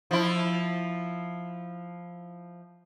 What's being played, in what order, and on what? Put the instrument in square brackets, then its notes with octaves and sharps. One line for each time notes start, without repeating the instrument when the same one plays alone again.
[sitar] F3 E4